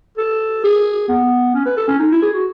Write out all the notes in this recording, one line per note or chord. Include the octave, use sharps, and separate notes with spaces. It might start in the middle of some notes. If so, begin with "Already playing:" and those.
A4
G#4
B3
C#4
B4
A4
C#4
D#4
E4
G#4
F#4